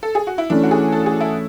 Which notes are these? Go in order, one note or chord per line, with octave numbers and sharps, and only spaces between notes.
A4
G#4
F#4
E4
E3 A3 C#4 D4
F#4
G#4
A4
G#4
E4